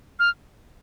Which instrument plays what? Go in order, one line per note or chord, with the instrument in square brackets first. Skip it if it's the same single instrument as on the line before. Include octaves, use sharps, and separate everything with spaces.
[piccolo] F6